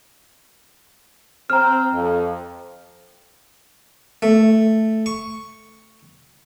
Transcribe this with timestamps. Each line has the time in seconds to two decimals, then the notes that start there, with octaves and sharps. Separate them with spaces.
1.50 C4 A#5 F6
1.93 F2
4.22 A3
5.06 C#6